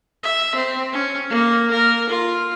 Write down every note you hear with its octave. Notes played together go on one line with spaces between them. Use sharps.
E5
C4
C#4
A#3
A#4
F4